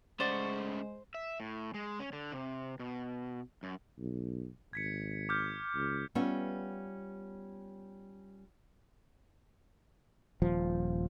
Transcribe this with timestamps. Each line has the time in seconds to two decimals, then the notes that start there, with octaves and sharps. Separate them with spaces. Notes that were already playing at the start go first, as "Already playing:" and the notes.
0.20 C#3 G#3 A3 C5 D5 F#5 C#6
1.15 E5
1.40 A2
1.74 G#3
1.99 C#4
2.13 D3
2.32 C3
2.80 B2
3.63 F#2
3.99 B1
4.73 G#1 G#6 B6 C#7
5.29 D6 F6 G6
5.75 C#2
6.15 G3 B3 C#4 F4 E5
10.42 D#1 F3